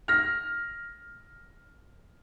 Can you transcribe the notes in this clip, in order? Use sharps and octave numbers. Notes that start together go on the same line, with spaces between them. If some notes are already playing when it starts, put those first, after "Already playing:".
F6 A#6